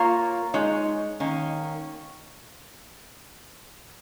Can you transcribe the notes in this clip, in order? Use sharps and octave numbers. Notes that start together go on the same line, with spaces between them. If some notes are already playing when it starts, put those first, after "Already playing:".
Already playing: A#3 F4 A#4 C#5
G#3 D#4 C#5
D#3 A#3 C#4